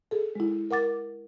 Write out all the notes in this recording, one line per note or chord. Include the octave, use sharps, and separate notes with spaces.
G#4 A4
G#3 E4
A#4 F#5 D6 A6